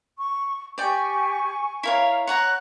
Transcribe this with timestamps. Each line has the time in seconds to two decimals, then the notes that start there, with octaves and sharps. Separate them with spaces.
0.18 C#6
0.78 G4 D5 G5 G#5 C#6
1.83 E4 A#4 C#5 F5
2.27 C#5 F#5 A#5 F#6